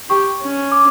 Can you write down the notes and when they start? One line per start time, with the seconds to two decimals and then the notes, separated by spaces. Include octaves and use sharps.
0.09 G4 C#6
0.41 C#4
0.72 D6